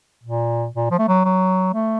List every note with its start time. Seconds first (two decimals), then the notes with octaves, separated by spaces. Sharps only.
0.24 A#2
0.74 A#2
0.91 F3
0.99 A3
1.08 F#3
1.25 F#3
1.74 A3